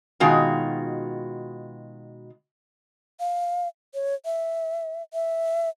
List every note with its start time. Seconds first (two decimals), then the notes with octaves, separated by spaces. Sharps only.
0.20 B2 D#3 G#3 F4 F#4
3.20 F5
3.94 C#5
4.25 E5
5.13 E5